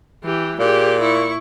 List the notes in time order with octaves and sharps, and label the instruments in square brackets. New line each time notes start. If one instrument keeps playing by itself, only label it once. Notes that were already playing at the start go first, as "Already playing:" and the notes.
[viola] E3 G4
[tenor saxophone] A#2 [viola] G4 G#4
[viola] E4 C#6